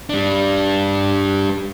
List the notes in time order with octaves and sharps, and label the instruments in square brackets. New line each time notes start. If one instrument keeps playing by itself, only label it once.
[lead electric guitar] G3 D4